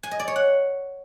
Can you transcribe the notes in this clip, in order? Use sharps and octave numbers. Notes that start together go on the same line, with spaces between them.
G#5
D#5
D5
C#5
F#5